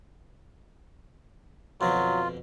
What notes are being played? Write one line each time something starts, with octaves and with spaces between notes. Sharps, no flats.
F2 B2 D3 F#3 F4